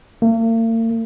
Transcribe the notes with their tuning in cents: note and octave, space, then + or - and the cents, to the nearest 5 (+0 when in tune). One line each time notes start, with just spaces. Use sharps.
A#3 -45